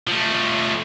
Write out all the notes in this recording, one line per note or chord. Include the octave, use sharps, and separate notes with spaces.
F3 A3